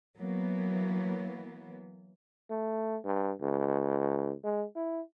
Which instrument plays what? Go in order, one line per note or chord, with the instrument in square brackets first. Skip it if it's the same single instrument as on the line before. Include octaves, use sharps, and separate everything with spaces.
[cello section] E3 F#3 A#3 B3
[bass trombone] A3
G2
C#2
G#3
E4